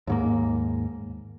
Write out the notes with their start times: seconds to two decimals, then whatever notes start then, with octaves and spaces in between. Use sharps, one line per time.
0.07 D#2 G#2 A#3